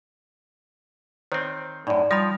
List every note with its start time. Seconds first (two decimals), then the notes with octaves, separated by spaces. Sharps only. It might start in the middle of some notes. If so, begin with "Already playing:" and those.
1.32 D#3 C4 C5 C#5
1.87 F#2 A2 D#4 D5
2.11 F3 G3 B5 D#6